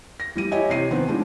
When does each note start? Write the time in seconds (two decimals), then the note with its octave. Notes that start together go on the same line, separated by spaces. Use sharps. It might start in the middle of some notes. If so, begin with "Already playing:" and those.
0.20 A#6
0.35 E3 G3 D#7
0.52 E4 G4 C#5 D#5 G#5
0.70 C3 C#5 C7 D#7
0.91 D#3 B3 C4
1.08 E3 F3 G#3 D4 F4